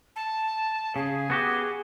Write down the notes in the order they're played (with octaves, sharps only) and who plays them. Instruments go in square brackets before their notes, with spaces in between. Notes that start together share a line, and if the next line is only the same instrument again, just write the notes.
[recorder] A5
[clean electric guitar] C#3 [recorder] G#4
[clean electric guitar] B3 F#4 G4